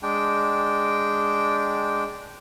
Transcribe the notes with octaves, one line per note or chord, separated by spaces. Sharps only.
G#3 D4 G5